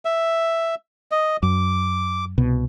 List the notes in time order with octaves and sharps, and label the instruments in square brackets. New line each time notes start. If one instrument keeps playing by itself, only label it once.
[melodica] E5
D#5
[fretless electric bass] F#2 [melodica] D6
[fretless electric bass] C2 B2